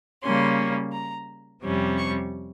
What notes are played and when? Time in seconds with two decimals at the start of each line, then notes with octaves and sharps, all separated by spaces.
0.22 C#3 G3 A#3 C#4 C6
0.92 A#5
1.62 F2 C3 G3 C#4
1.97 C#6